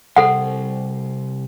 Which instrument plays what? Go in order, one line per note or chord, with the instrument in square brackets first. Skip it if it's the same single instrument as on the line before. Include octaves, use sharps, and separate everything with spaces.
[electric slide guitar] C3 G3 C5 [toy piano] A4 F#5